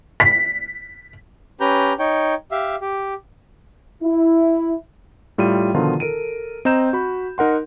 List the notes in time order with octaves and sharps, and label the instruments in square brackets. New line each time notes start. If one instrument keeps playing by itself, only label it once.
[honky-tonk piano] B6
[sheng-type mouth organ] C#4 G4 B4 A#5 G6
D#4 C#5 G5
G4 E5 F5
G4
[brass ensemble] E4
[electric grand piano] A2 G3 F4 D#7
B2 D3 D#3 F3 D#4 F4
A4 A#4 D7 D#7
C4 D#5 A#5 G6 E7
F#4 B5
D#4 A#4 F#5 C6